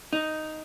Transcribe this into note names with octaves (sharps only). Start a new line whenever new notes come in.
D#4